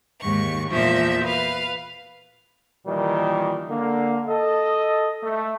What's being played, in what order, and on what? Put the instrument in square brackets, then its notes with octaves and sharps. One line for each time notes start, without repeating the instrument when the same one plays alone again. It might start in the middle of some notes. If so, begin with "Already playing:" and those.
[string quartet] D#2 G#2 C#6
E2 A#2 F3 E5
B4 F5
[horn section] A#2 D#3 E3 G3
D3 A#3
A4 D#5
A3